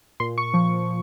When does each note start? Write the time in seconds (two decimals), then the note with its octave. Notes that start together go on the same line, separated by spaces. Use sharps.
0.20 A#2 C6
0.38 C#6
0.54 F3